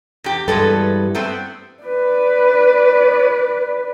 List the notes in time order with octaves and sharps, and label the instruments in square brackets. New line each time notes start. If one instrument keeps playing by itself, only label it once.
[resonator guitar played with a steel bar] E2 G4
[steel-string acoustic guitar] G2 E3 [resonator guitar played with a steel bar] G#3 B3 A4
[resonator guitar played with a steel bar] A3 B3 C4
[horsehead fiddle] B4 D5